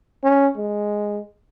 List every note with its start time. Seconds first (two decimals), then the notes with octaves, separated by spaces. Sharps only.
0.24 C#4
0.57 G#3